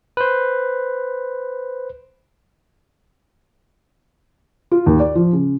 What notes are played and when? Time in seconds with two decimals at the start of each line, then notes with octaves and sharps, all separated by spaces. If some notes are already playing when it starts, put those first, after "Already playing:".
0.17 B4 C5
4.71 F4
4.86 D#2
5.00 D5
5.15 F3
5.33 C#3